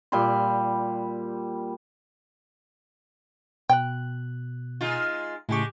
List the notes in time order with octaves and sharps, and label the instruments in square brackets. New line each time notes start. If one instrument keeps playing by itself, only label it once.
[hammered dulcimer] A#2 G3 B5 C6
[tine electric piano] B2 F#6 [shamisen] G5
[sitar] G#3 D#4 F4
[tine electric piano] A2 C#3 C#6 [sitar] G#3 G4